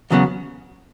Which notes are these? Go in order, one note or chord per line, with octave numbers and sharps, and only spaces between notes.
E2 C#3 F#3 B3